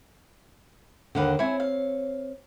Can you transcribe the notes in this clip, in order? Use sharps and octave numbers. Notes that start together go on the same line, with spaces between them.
D#2 D3 B4 F5 F#5
C4 E4 C#5 G#5
F5